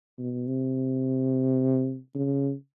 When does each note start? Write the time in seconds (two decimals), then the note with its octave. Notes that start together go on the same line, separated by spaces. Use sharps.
0.19 B2
0.47 C3
2.15 C#3